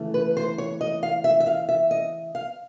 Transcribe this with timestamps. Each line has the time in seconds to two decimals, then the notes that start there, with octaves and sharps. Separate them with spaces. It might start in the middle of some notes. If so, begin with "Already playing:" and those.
Already playing: C#3 E3 A3
0.14 B4
0.37 C5
0.58 C#5
0.81 D#5
1.03 F5
1.24 E5
1.40 E5
1.47 F5
1.69 E5
1.91 D#5
2.35 F5